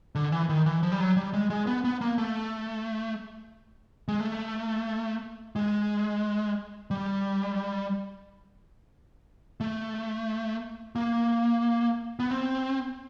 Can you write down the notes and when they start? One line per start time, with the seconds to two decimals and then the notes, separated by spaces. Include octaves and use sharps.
0.15 D3
0.32 E3
0.49 D#3
0.66 E3
0.83 F3
0.92 G3
1.00 F#3
1.17 G3
1.33 G#3
1.50 G#3
1.67 B3
1.85 B3
2.01 A#3
2.18 A3
4.08 G#3
4.20 A3
5.56 G#3
6.91 G3
9.61 A3
10.96 A#3
12.19 B3
12.31 C4